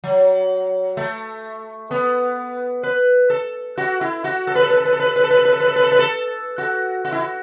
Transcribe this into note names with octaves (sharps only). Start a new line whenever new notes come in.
F#3
A3
B3
B4
A4
F#4
E4
F#4
A4
B4
A4
B4
A4
B4
A4
B4
A4
B4
A4
B4
A4
B4
A4
B4
A4
B4
A4
B4
A4
F#4
F#4
E4
F#4